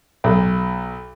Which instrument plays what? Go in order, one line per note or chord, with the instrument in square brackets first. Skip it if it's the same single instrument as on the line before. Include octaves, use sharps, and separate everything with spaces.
[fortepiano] B1